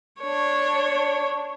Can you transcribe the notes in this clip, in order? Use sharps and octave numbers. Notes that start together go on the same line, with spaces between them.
D4 C#5